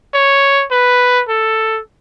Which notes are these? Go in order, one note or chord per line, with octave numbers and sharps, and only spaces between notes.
C#5
B4
A4